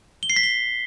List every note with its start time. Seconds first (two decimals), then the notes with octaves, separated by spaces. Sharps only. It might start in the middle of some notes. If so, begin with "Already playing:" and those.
0.23 G7
0.30 C7
0.36 B6
0.43 G7